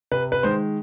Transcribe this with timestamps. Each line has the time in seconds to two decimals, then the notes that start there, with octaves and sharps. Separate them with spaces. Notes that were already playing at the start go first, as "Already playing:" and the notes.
0.12 C3 B4
0.32 B4
0.43 D#3 G#3 C5